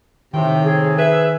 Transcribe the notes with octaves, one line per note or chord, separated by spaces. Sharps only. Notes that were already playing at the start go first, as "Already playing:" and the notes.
A2 C3 D#3 G5
G#4
B4 E5